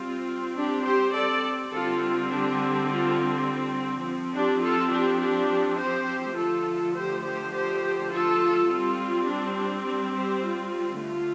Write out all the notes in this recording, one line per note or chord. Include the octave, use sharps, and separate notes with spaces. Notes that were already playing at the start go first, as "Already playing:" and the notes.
Already playing: G3 C4 F4
D4 G4
G4 C5
A4 D5
D3 G3 C4 F4 A4
F4
D4 G4
F4 A4
F3 C4
D4 G4
F4 A4
D4 G4
D4 G4
G4 C5
D3 F3 A3 F4 A4
G4 C5
G4 C5
G4 C5
F4 A4
G3 C4 F4
D4
D4
D4
G4 C5
F4
D3 A3 F4